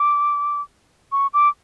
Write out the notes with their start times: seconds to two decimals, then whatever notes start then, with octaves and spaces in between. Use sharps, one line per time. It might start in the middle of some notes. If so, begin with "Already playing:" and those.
Already playing: D6
1.12 C#6
1.34 D6